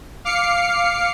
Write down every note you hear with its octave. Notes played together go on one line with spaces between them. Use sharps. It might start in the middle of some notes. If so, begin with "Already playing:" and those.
F5 D6 F6 C7 C#7